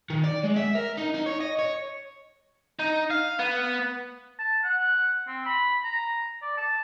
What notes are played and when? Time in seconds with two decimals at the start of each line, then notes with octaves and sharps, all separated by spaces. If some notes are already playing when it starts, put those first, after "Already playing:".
0.10 D#3
0.24 D5
0.44 G#3
0.56 E5
0.75 A#4
0.97 D#4
1.14 D#4
1.26 C#5
1.40 D#5
1.59 C#5
2.79 D#4
3.11 F5
3.39 B3
4.39 A5
4.64 F#5
5.28 C4
5.46 B5
5.84 A#5
6.42 D5
6.58 A5